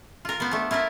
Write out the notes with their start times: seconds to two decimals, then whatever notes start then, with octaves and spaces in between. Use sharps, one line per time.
0.25 F4 A#4
0.40 B3 C5
0.51 A3 D4
0.71 E4 F4 A#4 E5